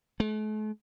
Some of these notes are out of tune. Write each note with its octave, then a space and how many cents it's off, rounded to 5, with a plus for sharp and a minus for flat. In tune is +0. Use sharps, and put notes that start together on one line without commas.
A3 -45